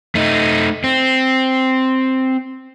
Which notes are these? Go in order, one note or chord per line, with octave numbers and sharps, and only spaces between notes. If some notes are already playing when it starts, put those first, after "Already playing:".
A3 D#4
C4